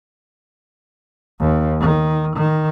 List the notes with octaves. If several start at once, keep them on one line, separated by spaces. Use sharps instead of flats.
D#2
D#3
D#3